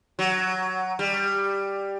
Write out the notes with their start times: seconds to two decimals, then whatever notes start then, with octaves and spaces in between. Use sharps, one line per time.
0.19 F#3
0.99 G3